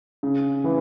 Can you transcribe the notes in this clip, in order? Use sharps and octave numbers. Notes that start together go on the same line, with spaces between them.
C#3
E3